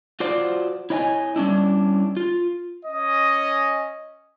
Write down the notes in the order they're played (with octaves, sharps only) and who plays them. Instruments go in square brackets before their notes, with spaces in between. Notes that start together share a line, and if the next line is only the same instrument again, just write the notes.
[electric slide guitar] F4 F#4 C5 D5
E4 C#5 D#5 G5 G#5
G3 C#4 D4 E4
F4
[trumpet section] C#4 D#5